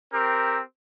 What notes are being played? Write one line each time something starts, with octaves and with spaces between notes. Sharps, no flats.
C4 G4 A#4